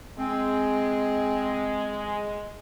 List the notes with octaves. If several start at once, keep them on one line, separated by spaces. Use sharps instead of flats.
G#3 C4